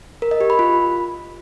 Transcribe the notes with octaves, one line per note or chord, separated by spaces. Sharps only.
A#4
D#5
G4
B5
F4